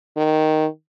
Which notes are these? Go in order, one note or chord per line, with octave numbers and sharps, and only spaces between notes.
D#3